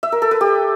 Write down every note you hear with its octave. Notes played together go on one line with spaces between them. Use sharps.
E5
A#4
A4
B4
G4